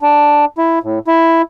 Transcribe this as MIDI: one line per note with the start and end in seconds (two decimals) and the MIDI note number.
0.01 0.45 62
0.58 0.79 64
0.83 0.99 45
1.07 1.42 64